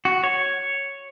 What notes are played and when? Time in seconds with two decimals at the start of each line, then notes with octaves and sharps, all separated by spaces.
0.05 F#4
0.24 C#5